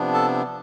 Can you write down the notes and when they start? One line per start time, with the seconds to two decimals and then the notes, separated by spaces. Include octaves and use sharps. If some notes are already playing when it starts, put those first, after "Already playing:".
Already playing: C3 F3 B3 D4
0.13 A4 A5